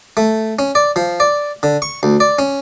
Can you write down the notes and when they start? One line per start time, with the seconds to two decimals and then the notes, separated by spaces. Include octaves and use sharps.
0.17 A3
0.59 C#4
0.75 D5
0.96 F3
1.20 D5
1.63 D3
1.82 C#6
2.03 D2
2.20 D5
2.39 C#4